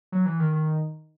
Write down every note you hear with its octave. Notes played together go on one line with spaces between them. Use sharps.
F#3
E3
D#3
D#3